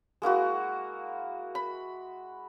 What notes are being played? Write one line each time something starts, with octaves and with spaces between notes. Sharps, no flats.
G#3 A#3 E4 F#4
B5